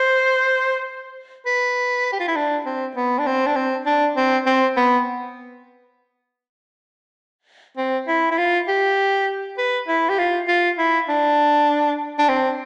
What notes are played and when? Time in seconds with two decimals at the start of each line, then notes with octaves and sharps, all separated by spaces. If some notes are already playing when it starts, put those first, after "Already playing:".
Already playing: C5
1.46 B4
2.12 G4
2.20 F4
2.28 E4
2.36 D4
2.66 C4
2.96 B3
3.19 D4
3.27 C4
3.47 D4
3.56 C4
3.86 D4
4.17 C4
4.46 C4
4.77 B3
7.77 C4
8.08 E4
8.31 E4
8.38 F4
8.68 G4
9.58 B4
9.88 E4
10.09 G4
10.19 F4
10.48 F4
10.78 E4
11.09 D4
12.19 D4
12.29 C4